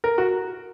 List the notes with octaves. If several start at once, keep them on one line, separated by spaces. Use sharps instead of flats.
A#4
F#4